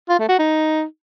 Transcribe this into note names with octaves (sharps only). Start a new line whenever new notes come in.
F4
A3
F#4
D#4